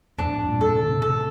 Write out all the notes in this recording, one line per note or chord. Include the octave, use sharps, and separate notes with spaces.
F2 A2 D4
G2 A#2
A4
C3
D3
A2 C3
A2 C3 A4